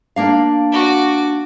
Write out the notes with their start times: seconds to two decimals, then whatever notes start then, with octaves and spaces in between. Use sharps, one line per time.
0.16 A#3 D4 F5
0.72 F#4 D6